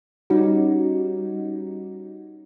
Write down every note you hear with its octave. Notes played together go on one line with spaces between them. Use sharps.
G3 C#4 D#4 F#4